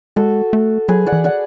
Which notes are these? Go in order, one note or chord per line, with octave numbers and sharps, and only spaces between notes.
G#3 F#4 A4
A3
F#3 G#4 B4
D5 F#5
E3
D5 F#5